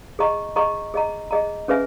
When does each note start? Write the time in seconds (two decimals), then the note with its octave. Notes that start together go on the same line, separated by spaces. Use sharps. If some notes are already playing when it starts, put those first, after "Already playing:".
0.19 G#4 D#5 A#5 C#6
0.56 G#4 D#5 A#5 C#6
0.94 G#4 D#5 A#5
1.31 G#4 D#5 A#5
1.68 C#4 G#4 B4 E5 G#5